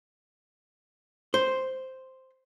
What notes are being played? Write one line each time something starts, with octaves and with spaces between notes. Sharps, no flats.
C5